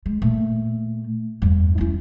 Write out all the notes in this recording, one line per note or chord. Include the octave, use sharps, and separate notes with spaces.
G#3
A#2 A3
E2 G2
C#4 E4